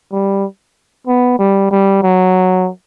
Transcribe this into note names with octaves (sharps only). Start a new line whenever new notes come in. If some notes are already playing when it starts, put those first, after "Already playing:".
G3
B3
G3
G3
F#3